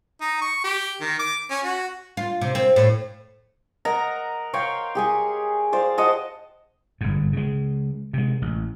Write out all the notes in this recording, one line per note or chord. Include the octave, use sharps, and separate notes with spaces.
D#4
C#6
G4
D#3
D6
C#4
F#4
F4
C3
C4
A2
A#4 D#5 F#5 A#5
C#5 F5 G5 C6
G4 G#4 G#5
C5 D5 F5
C5 D#5 F#5 A5
G1 G#2
C#3 G#3
C3 G#3
A1